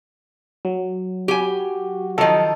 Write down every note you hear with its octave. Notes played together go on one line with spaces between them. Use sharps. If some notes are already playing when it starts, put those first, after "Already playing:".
F#3
F#4 G4 G#5
D#3 F3 D#4 A4